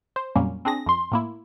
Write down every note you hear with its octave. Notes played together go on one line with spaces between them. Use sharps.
C5
F2 A#2 F#3 G3 A#3 C#4
C4 D4 G#4 A#6
F2 C6
A2 A#3 E4